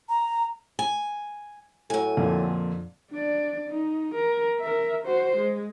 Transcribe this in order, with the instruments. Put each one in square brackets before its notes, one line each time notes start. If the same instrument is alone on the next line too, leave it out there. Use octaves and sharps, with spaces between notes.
[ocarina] A#5
[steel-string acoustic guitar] G#5
[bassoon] A2 [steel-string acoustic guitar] F#3 G#5
[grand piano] F2 A#2 D3
[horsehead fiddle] D4 D5
D#4
A#4
A#4 E5
F#4 C5
G#3